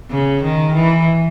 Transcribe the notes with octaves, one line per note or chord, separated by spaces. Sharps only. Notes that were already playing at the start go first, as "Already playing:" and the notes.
C#3
D#3
E3